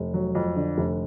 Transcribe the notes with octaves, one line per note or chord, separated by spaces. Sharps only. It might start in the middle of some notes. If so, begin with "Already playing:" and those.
Already playing: F1
F#3
F2
D3
F1